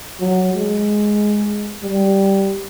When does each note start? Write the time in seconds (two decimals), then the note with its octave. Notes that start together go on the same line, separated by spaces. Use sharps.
0.21 F#3
0.54 G#3
1.83 G3